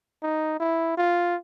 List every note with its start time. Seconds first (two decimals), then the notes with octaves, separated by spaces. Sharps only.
0.23 D#4
0.60 E4
0.97 F4